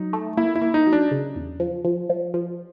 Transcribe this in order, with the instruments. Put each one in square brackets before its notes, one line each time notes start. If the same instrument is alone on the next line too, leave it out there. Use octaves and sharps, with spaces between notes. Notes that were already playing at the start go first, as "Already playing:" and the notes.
Already playing: [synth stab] F#3 [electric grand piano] D#4
[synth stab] A3
[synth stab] A#3 [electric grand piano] E4
[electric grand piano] E4
[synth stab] A#3
[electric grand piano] D#4
[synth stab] F#3
[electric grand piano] D4
[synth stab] C#3
E2
F3
F3
F3
F3